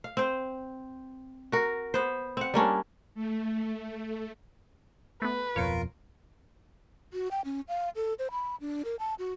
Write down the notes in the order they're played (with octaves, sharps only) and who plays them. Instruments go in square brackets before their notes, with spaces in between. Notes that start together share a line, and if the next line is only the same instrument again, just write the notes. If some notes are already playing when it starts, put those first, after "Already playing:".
[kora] F5
C4 C5
F#4 A#4
B3 C5
C4 F#5
G3 A#3 C#4 D4
[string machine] A3
[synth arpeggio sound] A3 B3 [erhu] B4
[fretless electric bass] D1 F2 B2 [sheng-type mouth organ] F4 A#4 [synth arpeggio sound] C#5
[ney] F#4
G5
C#4
F5
A4
C5
B5
D4
A#4
A5
F#4